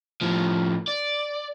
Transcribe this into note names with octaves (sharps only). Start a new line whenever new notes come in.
A2 F3
D5